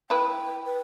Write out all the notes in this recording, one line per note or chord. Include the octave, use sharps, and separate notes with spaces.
E4 B4 G5
B4